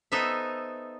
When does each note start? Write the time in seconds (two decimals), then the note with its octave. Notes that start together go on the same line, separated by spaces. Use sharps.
0.12 B3 D#4 A4 C5 E5